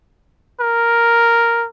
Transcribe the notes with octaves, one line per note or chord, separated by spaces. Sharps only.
A#4